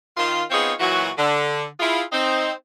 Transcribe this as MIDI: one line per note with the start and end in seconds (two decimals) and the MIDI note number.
0.17 0.42 51
0.17 0.42 65
0.17 0.42 84
0.50 0.72 59
0.50 0.72 60
0.50 0.72 63
0.50 0.72 65
0.50 0.72 68
0.50 0.72 73
0.80 1.09 46
0.80 1.09 52
0.80 1.09 54
0.80 1.09 66
1.17 1.65 50
1.80 2.02 64
1.80 2.02 65
1.80 2.02 68
2.13 2.51 60
2.13 2.51 63